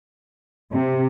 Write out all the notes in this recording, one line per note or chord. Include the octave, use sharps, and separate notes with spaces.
C3